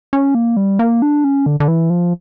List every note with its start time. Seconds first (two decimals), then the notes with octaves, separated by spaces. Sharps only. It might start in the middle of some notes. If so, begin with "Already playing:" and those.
0.13 C#4
0.35 A#3
0.56 G3
0.79 A#3
1.02 D4
1.24 C#4
1.46 D3
1.60 D3
1.68 E3
1.90 F3